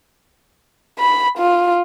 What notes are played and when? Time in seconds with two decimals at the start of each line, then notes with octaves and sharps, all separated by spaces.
0.99 B5
1.38 F4